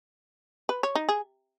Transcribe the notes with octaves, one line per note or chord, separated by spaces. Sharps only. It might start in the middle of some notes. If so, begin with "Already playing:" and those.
B4
C#5
D#4
G#4